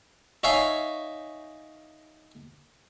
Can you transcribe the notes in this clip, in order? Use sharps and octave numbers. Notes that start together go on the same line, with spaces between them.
D#4 C#5 E5 F5 G#5